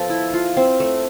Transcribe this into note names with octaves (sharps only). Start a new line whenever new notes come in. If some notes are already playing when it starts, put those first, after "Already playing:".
Already playing: F3 B3 A4
E4
F4
C4
A3